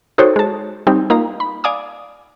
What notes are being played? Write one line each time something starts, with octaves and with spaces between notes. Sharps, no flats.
D#4 F#4 A4 C5 C#5 G5
G#3 A5
G3 C4 D#4 G4
A#3 D#4 F4 F5 A#5
B5
D5 F5 G#5 D6 D#6